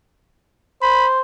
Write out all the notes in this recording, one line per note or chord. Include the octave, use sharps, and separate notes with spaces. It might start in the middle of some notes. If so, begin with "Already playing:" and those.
C5 B5